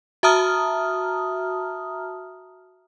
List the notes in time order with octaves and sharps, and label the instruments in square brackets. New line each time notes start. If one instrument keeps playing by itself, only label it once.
[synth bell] F#4 E5 A5 A#5 D#6 F6